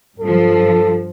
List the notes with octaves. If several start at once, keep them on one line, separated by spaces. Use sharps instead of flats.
G2 F3 A4